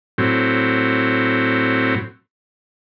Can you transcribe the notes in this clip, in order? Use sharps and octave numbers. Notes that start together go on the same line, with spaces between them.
A2 F#3 C4